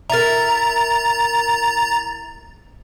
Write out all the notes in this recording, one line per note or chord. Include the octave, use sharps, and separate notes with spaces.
E4 A#4 A#5 A6